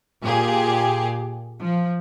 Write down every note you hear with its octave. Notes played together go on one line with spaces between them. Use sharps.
A#2 G4 G#4
F3